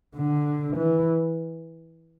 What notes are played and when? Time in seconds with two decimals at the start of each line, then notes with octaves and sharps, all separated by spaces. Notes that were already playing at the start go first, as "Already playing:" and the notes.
0.15 D3
0.77 E3